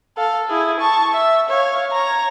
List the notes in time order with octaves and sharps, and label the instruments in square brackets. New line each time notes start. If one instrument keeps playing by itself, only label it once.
[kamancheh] A4 F5
E4 G#4
A5 C#6
E5
C#5 F5
C#5 A#5